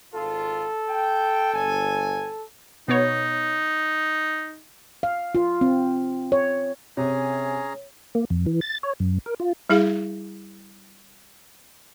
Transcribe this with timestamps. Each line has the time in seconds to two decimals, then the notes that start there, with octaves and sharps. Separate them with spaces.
0.15 G#1 F4 A4
0.89 G5
1.53 G1 G#5
2.88 B2 B3 D#4 C#5
5.03 F5
5.35 F4
5.61 C4
6.32 C#5
6.97 C3 C#4 G#4 C#5 A#5
8.15 A#3
8.30 F2
8.46 E3
8.61 A6
8.83 C#5
9.00 F#2
9.26 A#4
9.40 F4
9.70 G3 E4 G#4 F5